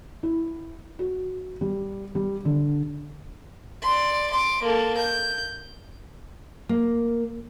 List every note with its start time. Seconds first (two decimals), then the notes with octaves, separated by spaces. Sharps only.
0.23 E4
0.99 F#4
1.61 G3
2.15 G3
2.45 D3
3.83 D5 C6
4.31 C6 D6
4.64 A#3 A4
4.98 G6
6.69 A#3